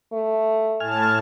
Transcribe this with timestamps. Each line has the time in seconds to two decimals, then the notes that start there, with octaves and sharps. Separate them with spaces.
0.12 A3
0.80 A2 G#5 A5 F6